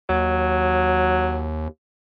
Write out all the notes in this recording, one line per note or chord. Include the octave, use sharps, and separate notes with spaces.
D#2 F#3